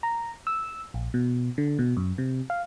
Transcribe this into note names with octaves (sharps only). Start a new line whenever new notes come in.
A#5
E6
A#1
B2
D3
B2
F#2
C3
F5